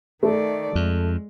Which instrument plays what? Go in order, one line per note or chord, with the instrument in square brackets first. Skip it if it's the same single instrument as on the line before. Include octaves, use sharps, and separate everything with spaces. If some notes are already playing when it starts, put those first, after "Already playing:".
[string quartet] D#3 D5 [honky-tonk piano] A3
[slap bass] F2 [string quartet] G#3